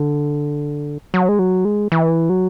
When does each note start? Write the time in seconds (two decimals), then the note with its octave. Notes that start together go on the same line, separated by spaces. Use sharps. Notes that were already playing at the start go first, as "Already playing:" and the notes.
Already playing: D3
1.14 F#3
1.29 G#3
1.39 F#3
1.65 G#3
1.92 E3
2.29 F#3